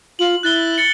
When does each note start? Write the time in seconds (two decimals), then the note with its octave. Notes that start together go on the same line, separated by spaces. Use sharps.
0.19 F4 F#7
0.43 E4 F#6 A6 G7
0.78 A6 C#7